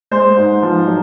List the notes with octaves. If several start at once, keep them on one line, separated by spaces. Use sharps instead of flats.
G#3 C5
G#2
F3
F#3